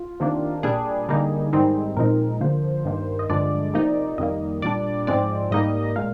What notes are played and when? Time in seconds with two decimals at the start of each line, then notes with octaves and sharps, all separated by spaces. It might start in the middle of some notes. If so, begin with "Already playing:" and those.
Already playing: F4
0.20 C3 D#3 A#3 D4
0.63 A#2 G3 D4 G#4
1.09 D3 G3 A#3 D#4
1.53 G#2 D#3 G3 C4 D#4
1.97 A#2 F3 G#3 C4 D#4 A#4
2.41 D3 F3 A#3 C5
2.85 G2 D#3 A#3
3.19 D#5
3.30 G2 D3 F3 G#3 D4 D5
3.74 C3 F3 A#3 D#4
4.18 F2 D#3 G3 A#3 D#5
4.62 A#2 G3 D4 D5
5.07 G#2 F3 G#3 C4 D5
5.51 G#2 G3 A#3 D#4 D#5
5.96 A#2 G#3 F5